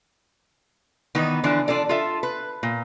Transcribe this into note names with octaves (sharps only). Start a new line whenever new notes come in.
D#3 E3 B3 D#4 B4
D3 E3 F3 D4
D4 F4 A4 D5
F4 A4 E5
B4
A#2